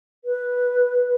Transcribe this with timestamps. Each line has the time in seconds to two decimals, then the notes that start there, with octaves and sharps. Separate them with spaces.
0.24 B4